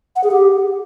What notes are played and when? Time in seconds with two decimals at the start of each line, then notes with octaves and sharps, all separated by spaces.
0.16 F#5
0.24 G#4
0.31 G4